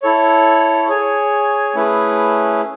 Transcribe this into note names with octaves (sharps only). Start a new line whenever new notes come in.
E4 A4 C#5
G#4 C#5 G#5
A3 C#4 E4 G#4 B4